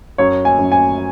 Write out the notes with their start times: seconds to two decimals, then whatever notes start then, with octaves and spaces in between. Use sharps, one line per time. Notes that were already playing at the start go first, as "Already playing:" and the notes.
0.18 F#2 C#5
0.45 G#5
0.59 F#2
0.72 G#5